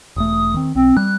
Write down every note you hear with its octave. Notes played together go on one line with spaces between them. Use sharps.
E1 A3 D#6
D#3 C4
B1 C4
G3 F#6